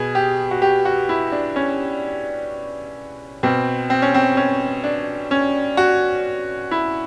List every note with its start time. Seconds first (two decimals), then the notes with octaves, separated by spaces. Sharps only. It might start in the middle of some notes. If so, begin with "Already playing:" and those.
Already playing: B2 G#4
0.15 G4
0.51 F#4
0.62 G4
0.85 F#4
1.09 E4
1.32 D4
1.56 C#4
3.43 B2 C4
3.90 C4
4.02 C#4
4.14 C4
4.37 C#4
4.84 D4
5.31 C#4
5.77 F#4
6.71 E4